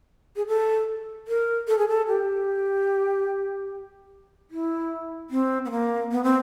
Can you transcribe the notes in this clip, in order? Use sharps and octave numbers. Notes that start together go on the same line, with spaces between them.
G#4
A4
A#4
A4
G#4
A4
G4
E4
C4
B3
A#3
B3
C4